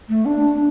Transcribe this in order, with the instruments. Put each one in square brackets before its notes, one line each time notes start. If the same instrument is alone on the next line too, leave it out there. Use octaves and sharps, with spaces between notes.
[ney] A3
D4